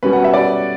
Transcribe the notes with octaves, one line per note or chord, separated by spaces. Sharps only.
B2 G3 C#4 B4
F#5
E5
D5